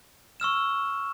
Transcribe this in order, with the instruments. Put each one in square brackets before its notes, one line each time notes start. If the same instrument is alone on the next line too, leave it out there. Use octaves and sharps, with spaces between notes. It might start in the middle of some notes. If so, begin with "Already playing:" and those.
[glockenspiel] C#6 E6 F6 E7